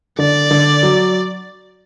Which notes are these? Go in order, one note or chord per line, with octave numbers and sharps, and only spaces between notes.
D3 D5
D3
F#3